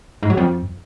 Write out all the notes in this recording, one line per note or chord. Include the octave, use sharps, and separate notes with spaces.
G#2
F#3
F2